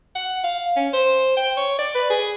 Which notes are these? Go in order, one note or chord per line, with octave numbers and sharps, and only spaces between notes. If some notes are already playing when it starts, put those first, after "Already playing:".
F#5
F5
C#4
C5
G5
C#5
D5
B4
G#4